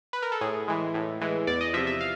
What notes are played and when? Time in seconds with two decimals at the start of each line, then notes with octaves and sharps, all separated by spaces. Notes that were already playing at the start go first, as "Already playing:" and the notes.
0.13 B4
0.22 A#4
0.32 A4
0.41 A2 G#4
0.68 E3 G#3
0.94 A2
1.21 E3 G#3
1.47 E2 D5
1.61 D#5
1.74 C3 F3 E5
1.87 E5
2.01 F5